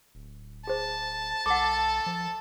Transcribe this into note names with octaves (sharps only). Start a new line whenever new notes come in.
D1
G#4 C5 A5
B1 A4 F#5 D6
F3